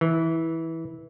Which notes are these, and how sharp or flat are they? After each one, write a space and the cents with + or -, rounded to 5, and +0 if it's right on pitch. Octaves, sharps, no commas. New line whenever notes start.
E3 -15